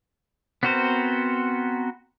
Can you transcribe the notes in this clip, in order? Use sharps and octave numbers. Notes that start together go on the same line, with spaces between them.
B3 C4 F#4 A#4 C5